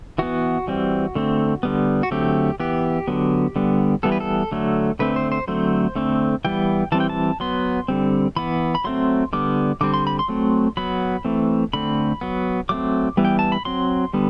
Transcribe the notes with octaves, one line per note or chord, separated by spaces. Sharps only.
E3 B3 F#4
E3 G3 C4
D3 A3 C4
D3 G3 B3
F#4
D3 F#3 A3 C4 G4
E3 B3 G4
D3 F#3 B3
D3 G3 B3
E3 G3 B3 A4
B4
A4
D3 F#3 A3
D3 A3 C4 B4
C5
C5
D3 F#3 A3 C4 C5
D3 A3 C4
E3 G3 B3 G5
E3 G3 C4 A5
G5
A5
F#3 B3 C6
D3 G3 C4
E3 B3 B5
B5
F#3 A3 C4 C6
D3 G3 B3 D6
D3 G3 C4 D6
C6
B5
C6
F#3 A3 C4
F#3 B3 B5
E3 A3 C4
D3 A3 C4 B5
F#3 B3
F#3 A3 C4 D6
E3 G3 B3
G5
A5
B5
F#3 C4 C6
D3 G3 B3